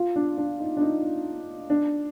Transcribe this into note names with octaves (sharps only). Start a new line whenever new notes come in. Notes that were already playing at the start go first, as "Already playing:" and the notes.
Already playing: F4
D4
D4
D#4
D4
D#4
D4